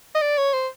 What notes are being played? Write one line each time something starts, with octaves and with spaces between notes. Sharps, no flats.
D#5
D5
C#5
C5